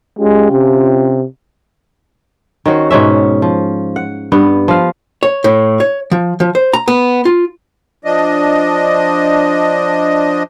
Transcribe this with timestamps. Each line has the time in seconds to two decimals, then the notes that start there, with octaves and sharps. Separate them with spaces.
0.19 G#3 C#4 F4 G4
0.52 C3
2.66 D#3 C#4 F#4 C5
2.91 G#2 B2 C#4 E5
3.42 F3
3.96 F#5
4.32 G2 B3 F#5
4.68 F3 F5
5.23 C#5
5.44 A2
5.80 C#5
6.11 F3
6.40 F3
6.55 C5
6.73 A#5
6.88 B3
7.25 F4
8.05 F3 D4 D#5